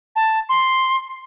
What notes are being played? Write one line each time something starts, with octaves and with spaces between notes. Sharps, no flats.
A5
C6